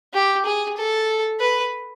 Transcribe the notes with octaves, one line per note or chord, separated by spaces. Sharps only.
G4
G#4
A4
B4